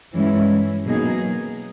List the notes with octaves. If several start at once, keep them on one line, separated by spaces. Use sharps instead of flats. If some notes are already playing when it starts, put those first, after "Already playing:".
G2 E3 G#3 C#4 E4
B2 F#3 A#3 D#4 G#4